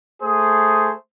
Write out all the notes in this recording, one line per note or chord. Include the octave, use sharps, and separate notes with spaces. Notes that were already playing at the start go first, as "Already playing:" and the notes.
A3 G#4 C5 D#6